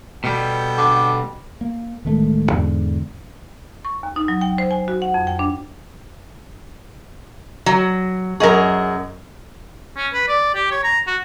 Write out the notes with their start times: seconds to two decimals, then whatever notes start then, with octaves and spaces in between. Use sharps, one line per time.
0.24 B2 G3 B3 A4 G5
0.78 D3 D6
1.61 A#3
2.05 D1 D#3 G#3 A3
2.52 E2 G#2 D3
3.85 C#6
4.03 D#2
4.16 D#4
4.28 F#3
4.41 G5
4.58 C5
4.71 G#5
4.88 F#4
5.02 F#5
5.14 F2
5.27 G5
5.39 D4
7.66 F#3
8.40 F#2 G#4 A#4 D#5 C#6
9.97 C#4
10.13 B4
10.28 D5
10.54 G4
10.71 C#5
10.84 A#5
11.07 F#4